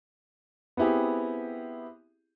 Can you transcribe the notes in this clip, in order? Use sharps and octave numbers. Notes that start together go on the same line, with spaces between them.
B3 C4 E4 G4 G#4